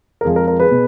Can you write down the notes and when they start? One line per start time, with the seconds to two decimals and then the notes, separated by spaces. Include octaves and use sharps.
0.21 A#4
0.25 F2 F3 G#3 G#4
0.36 A#4
0.48 A#4
0.60 G#4 B4
0.71 B2